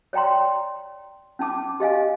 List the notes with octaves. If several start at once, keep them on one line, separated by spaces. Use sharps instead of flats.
C#5 D5 G5 A#5 C6
C#4 D#4 A5 D6
G4 D#5 F5 G#5